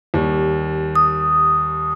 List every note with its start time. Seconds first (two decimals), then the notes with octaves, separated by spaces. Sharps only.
0.14 D#2 G3
0.95 D#6